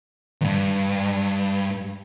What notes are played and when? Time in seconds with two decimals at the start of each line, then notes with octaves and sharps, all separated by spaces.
0.41 E2 G2